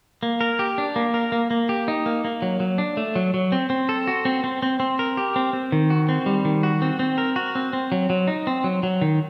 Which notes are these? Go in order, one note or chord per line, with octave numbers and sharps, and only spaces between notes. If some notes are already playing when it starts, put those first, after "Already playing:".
A#3
A#4
G4
D4
A#3
A#4
A#3
A#3
G4
D#4
A#3
A#3
F#3
F#3
D4
A3
F#3
F#3
C4
C4
A4
F#4
C4
C4
C4
C4
A#4
G4
C4
C4
D#3
F#4
C4
G3
D#3
F#4
C4
C4
A#4
F#4
C4
C4
F#3
F#3
D#4
C4
F#3
F#3
D#3